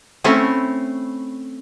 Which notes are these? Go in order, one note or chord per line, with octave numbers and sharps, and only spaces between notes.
A3 C4 C#4 E4